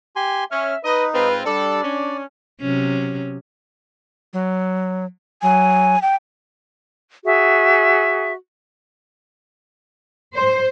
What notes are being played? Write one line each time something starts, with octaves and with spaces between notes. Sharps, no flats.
G4 G#5 C6
C#4 E5 F6
D#4 B4 D#5
G#2 C4 F4 B4
G3 D4 A4 D5
C#4
C3 F#3 C#4
F#3
F#3 G#5
G5
F#4 G#4 E5
C5